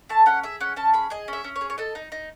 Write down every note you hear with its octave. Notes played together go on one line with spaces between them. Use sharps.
A3 A5
C#4 F#5
G#4 E5
C#4 F#5
C#4 A5
G#4 B5
G#4 D#5
C#4 E5
C#4
C#5
G#4
C#5
A4 D#5
D#4
D#4